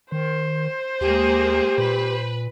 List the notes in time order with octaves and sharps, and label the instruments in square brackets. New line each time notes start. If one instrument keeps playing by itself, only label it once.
[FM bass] D#3 [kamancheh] C5
[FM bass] D#2 [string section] G#3 A#3 G#4 [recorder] G4
[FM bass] A#2 [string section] B4